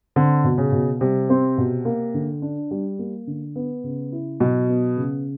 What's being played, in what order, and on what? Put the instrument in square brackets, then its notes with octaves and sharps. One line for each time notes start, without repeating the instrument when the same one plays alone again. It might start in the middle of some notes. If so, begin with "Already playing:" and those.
[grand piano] D3 [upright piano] C4
[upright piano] B2
[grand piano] C#3
[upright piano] B2
[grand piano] C3 [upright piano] G3
[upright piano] C4
B2
A#3
D3
D4
G3
A#3
D3
B3
C#3
E4
[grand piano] B2 [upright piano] F#3
[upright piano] B3
C#3